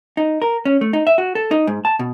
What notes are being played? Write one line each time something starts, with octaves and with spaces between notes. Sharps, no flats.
D#4
A#4
C#4
A3
D#4
E5
F#4
A4
D#4
G#2
A5
B2